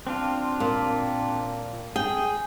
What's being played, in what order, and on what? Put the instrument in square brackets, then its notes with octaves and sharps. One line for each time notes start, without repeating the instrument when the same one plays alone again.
[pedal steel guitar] C4 D4 F4
[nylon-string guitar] A#2
[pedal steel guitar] G#4 [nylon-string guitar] G5